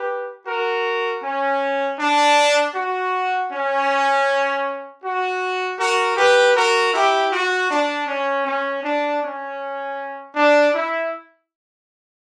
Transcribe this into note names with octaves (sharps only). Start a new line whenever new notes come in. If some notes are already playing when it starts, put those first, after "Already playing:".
Already playing: G4 B4
F#4 A#4
C#4
D4
F#4
C#4
F#4
F#4 A#4
G4 B4
F#4 A#4
E4 G4
F#4
D4
C#4
C#4
D4
C#4
D4
E4